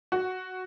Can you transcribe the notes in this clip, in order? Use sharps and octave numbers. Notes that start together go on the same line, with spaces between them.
F#4